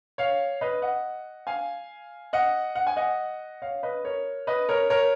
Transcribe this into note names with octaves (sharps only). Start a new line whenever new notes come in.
C#5 F5
B4 D#5
D#5 F#5
F5 G#5
D#5 F#5
F#5
G#5
D#5 F#5
C#5 F5
B4 D#5
A#4 C#5
B4 D#5
A#4 C#5
A#4 C#5